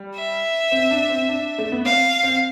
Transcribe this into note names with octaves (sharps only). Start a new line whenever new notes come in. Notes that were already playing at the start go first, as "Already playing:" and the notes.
Already playing: G3
E5
C4
D4
C4
D4
A3
B3
C4 F5
C4